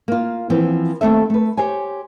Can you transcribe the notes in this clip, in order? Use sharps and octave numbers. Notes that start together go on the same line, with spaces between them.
A#3 F4
E3 F3 B3 C4
D#2 D3 A3 C4 A4 E5
A3 B4
G4 C5 C#5 G#5